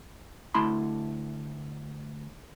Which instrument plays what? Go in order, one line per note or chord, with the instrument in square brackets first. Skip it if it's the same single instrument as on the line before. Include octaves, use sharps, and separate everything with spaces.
[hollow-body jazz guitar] D2 A3 E4 A5 B5 C6